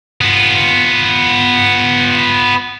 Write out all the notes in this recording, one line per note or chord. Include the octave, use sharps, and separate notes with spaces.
B3 F4